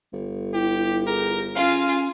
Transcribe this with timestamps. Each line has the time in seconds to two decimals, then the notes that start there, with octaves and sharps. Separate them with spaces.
0.13 G1
0.54 E4 G4
1.07 G#4 A#4
1.55 C#4 F4 F5 G#5